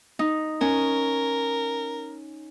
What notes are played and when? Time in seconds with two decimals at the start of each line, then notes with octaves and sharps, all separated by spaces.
0.19 D#4
0.61 C#4 A#4